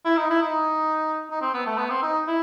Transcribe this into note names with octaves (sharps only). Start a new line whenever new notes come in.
E4
D#4
E4
D#4
D#4
C4
B3
A3
B3
C4
D#4
E4